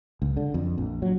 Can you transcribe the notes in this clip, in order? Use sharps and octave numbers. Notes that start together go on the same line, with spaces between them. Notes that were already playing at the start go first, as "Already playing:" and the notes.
C#2
D3
F2
A#1
F#3